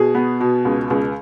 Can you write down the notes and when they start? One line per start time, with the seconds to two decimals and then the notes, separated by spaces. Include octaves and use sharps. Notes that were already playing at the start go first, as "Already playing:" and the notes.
Already playing: B2 G#4
0.15 B3
0.40 B2
0.65 C#2
0.90 C#2